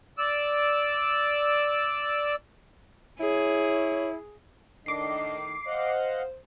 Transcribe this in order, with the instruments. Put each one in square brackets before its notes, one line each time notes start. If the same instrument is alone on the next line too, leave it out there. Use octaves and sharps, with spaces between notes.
[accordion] D5 E6
[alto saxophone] E4 [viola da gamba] G#4 [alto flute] C#5
[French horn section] A2 D#3 [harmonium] D4 D#5 [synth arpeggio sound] D6 C7
[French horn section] C5 [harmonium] D#5 F5 F#5